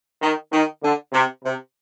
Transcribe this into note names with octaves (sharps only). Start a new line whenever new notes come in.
D#3
D#3
D3
C3
C3